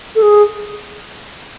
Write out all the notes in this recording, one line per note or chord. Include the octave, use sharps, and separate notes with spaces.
A4
G#4